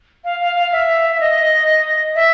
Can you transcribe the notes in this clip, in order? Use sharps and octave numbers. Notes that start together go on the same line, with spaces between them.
F5
F5
F5
E5
E5
D#5
E5